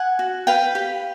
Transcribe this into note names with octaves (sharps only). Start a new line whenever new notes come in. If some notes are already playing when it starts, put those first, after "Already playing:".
Already playing: F#5 G#5
F#4
B4 F5 G5
G4